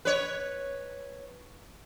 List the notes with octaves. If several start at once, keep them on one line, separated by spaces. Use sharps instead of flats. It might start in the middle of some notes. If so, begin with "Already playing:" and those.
B4 C#5